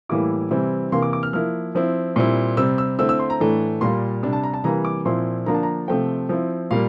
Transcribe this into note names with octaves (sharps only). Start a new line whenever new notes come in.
A2 E3 G3 A#3 E4 D6
C3 E3 G3 C4 E4
C3 E3 A#3 C6
D6
D6
F6
F3 A#3 E4 F6
F3 C4 E4
A#2 G3 C4 E4
C3 G3 C4 E6
E6
D3 A3 C4 E4 E6
E6
C6
A#5
A2 E3 A3 D4
A#2 G3 A#3 C6
C3 G3 D4
A5
A#5
A5
C3 E3 G3 A#3 A#5
D6
A#2 F3 C4 E4 C6
D3 F3 A#3 D4 A#5
A5
A#5
C3 F3 A3 C4 G5
F3 C4 E4
A#2 G3 A#3 F5